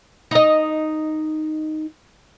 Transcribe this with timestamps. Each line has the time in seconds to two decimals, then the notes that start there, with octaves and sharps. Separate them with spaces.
0.31 D#4 D#5